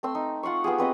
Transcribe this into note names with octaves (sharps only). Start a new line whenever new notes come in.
A3 C4 C6 E6
D#4
F4 F#5 C6 C#6
B3 F4 G4 G#4
C4 B4 D#5 F#5